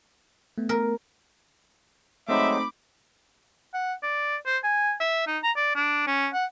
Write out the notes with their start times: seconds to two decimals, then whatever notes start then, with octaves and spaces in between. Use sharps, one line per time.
0.58 A3 B3
0.69 A#4
2.28 F#3 G#3 A3 C4 D#4 E5 B5 D6
3.74 F#5
4.03 D5
4.46 C5
4.64 G#5
5.00 E5
5.27 D#4
5.44 A#5
5.56 D5
5.75 D4
6.07 C#4
6.34 F#5